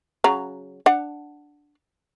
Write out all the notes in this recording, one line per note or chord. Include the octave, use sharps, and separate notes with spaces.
C#3 F#3 A#5
D4 F#5